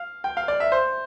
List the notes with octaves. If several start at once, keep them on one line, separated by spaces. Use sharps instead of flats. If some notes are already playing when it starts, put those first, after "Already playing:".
Already playing: F5
G5
F5
D5
E5
C5